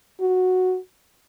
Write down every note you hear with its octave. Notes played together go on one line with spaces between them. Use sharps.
F#4